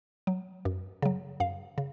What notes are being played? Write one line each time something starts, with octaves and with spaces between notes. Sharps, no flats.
F#3
F#2
C#3 F#3
F#2 F5
C#3